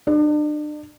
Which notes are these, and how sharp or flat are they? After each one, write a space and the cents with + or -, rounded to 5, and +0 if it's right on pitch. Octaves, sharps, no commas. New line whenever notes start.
D4 +40